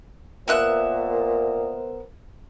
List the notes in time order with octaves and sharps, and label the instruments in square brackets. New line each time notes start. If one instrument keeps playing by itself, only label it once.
[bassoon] A#2 [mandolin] B3 E5 F#6 [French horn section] A#4 C5